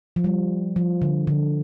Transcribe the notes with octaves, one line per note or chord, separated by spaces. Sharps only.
F3
G3
F3
D3
D3